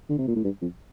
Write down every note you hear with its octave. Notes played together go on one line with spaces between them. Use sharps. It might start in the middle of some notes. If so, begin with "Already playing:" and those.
D3
C3
A#2
A2
G2
F2